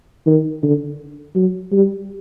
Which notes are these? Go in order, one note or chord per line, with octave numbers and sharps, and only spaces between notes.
D#3
D3
F#3
G3